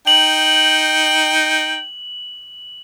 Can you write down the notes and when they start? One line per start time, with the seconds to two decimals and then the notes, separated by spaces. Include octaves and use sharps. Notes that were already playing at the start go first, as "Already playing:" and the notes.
0.07 D#4 G5 F#7